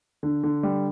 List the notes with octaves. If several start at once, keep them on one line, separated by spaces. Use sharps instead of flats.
D3
D3
G3